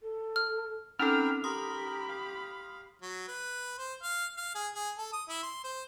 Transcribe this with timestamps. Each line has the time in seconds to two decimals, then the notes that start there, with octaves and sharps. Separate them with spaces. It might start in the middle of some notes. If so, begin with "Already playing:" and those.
0.02 A4
0.36 F6
0.99 C4 C#4 D#4 A4 A#4 G5 B5 F6
1.44 G4 A#4 B5 C6 D#6
2.09 F5
3.02 F#3
3.28 B4
3.78 C5
4.03 F5
4.37 F5
4.55 G#4
4.75 G#4
4.98 A4
5.13 D#6
5.28 E4
5.43 C6
5.64 C5